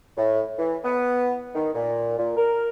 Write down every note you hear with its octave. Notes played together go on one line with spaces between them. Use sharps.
A2
E3
B3
D#3
A#2
A#2
A#4